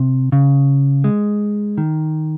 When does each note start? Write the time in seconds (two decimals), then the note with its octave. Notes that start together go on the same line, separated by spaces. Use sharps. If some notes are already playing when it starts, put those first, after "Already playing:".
Already playing: C3
0.32 C#3
1.04 G#3
1.78 D#3